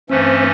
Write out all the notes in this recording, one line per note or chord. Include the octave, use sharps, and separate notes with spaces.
G2 E3 A3 C4 C#4